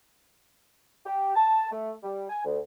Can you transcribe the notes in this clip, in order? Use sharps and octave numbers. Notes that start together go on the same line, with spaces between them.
G4
A5
A3
G3
G#5
D2